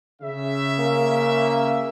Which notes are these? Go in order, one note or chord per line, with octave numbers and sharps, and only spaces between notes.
C#3 E5
A#3